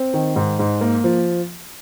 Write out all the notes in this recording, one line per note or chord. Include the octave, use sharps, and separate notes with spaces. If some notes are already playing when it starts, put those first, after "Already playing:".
Already playing: C4
D#3
G#2
G#2
A#3
F3